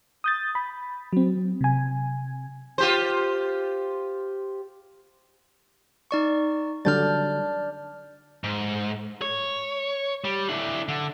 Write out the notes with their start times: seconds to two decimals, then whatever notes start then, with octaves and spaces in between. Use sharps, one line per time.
0.24 D#6 G6 A6
0.55 B5
1.13 F#3 C4
1.61 C3 G#5
2.78 F4 G4 C5
6.11 D#4 D5 C#6
6.85 D3 F#3 G3 D4 D5 F6 G6 A6
8.44 G#2
9.22 C#5
10.24 G3
10.49 D4 E4
10.88 D3